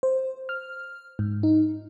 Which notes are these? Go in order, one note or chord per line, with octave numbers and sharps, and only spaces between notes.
C5
F6
G#2
D#4